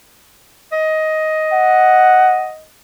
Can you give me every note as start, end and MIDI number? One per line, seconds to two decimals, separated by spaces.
0.72 2.63 75
1.53 2.52 78